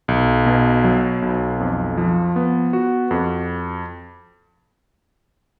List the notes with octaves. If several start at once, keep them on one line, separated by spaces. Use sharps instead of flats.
B1
B2
F#3
B1
F2
F3
B3
F#4
F2